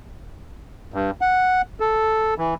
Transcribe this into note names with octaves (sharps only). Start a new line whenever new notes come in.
G2
F#5
A4
E3